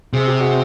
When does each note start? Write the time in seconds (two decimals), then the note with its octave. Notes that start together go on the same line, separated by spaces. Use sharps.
0.13 C3 G#4
0.27 G4
0.40 F#4 G#4